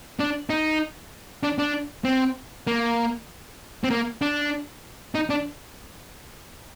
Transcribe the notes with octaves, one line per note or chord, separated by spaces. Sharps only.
D4
D#4
D4
D4
C4
A#3
C4
A#3
D4
D#4
D4